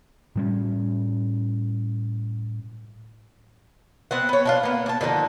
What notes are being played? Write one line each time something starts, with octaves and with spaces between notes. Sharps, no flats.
A2 G3 C#4
B3 C4 F#5
B3 C#5
D4 D#4 F4
A#3 B3
D4 A5
D3 D#3 F3 D#4